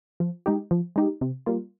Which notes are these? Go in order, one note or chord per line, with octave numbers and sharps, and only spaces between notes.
F3
G#3 D#4 G4
F3
G#3 D#4 G4
C3
G3 A#3 F4